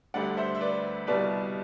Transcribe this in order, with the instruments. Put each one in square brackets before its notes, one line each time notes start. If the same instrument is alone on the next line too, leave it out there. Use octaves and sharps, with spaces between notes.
[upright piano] D2 D3 G3 D5 F#5
C5 E5
E5
B4 D5
C2 B2 G3 B4 D5